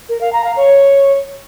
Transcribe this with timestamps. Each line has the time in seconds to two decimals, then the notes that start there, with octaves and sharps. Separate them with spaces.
0.09 A#4
0.21 F5
0.33 A#5
0.44 F5
0.56 C#5